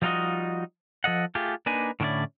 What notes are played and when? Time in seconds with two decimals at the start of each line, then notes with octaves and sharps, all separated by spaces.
0.02 F3 G3 D#4 F4 F#4 D#5
1.04 F3 A4 D#5 F#5
1.35 A3 F4 G4 G#4
1.66 A#3 D4 D#4 B4 G#5
2.00 A2 D3 C#4 D4 E4 D5